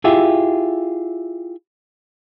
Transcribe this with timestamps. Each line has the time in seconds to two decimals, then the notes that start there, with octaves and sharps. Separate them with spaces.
0.04 E4 F4 G4 G#4 E5